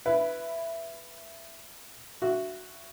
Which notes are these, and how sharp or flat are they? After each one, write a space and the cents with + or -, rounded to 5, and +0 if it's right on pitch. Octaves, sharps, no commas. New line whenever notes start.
E4 +15 B4 +0
F#4 +0 E5 +20